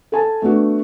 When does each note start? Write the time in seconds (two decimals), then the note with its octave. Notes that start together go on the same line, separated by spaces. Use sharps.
0.12 A4 G#5 A5
0.42 A3 B3 D4 F#4